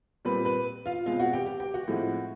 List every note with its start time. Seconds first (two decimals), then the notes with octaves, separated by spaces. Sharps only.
0.25 A#2 G3 C4 B4 B5
0.45 B4 B5
0.86 F4 F5
1.06 B2 G#3 C4 F4 F5
1.20 F#4 F#5
1.33 G4 G5
1.46 G4 G5
1.60 G4 G5
1.74 F#4 F#5
1.88 A2 F3 G#3 C4